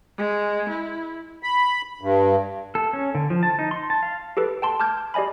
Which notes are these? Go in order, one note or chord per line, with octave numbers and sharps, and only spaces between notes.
G#3
E4
B5
G2
A4
C#4
D3
F3
A5
D#4
C6
A5
F5
G4 A4 B4
G5 A5 C6
A5 D6 F6 G6 G#6
G4 D5 D#5 G#5 B5